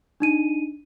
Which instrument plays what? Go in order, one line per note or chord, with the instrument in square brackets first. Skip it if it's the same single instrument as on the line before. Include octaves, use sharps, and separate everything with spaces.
[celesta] D4 D#4 D#7